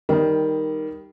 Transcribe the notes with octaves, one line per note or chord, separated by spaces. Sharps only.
D#3 G3